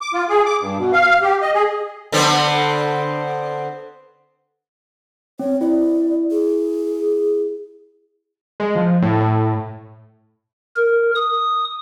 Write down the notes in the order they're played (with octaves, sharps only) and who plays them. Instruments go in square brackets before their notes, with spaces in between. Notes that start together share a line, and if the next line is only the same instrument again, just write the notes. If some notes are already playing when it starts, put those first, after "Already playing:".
[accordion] D6
F4
G#4
D6
G2
B2
F5
G4
D#5
G#4
[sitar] D3 B3 C4
[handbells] C4 [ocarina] C#5
[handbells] E4 [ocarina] D5
[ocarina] G#4
[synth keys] G#3
F3
A2
A2
[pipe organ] A#4
D#6